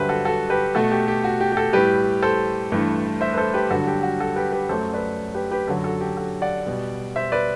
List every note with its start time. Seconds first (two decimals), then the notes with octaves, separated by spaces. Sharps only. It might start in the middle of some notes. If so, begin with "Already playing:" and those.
Already playing: G2 D3 F#3 G4 B4 C5 E5
0.09 F#4 A4
0.25 F#4 A4
0.50 G4 B4
0.75 B2 A3 F#4 A4
0.92 G4
1.08 G4
1.24 F#4
1.40 G4
1.52 G4
1.57 F#4 A4
1.73 A2 G3 G4 B4
2.22 A4 C5
2.72 G2 E3 A3
3.21 C5 E5
3.34 B4
3.38 A4 C5
3.54 G4 B4
3.70 G2 D3 F#3 F#4 A4
3.87 G4
4.03 F#4
4.20 F#4 A4
4.36 G4 B4
4.52 G4 B4
4.69 F#2 F#3 A3 A4 C5
4.93 B4 D5
5.34 G4 B4
5.51 G4 B4
5.67 F#2 D3 F#3 F#4 A4
5.84 F#4 A4
6.01 G4
6.17 F#4 A4
6.42 D5 F#5
6.66 B2 G3
7.16 C5 E5
7.32 B4 D5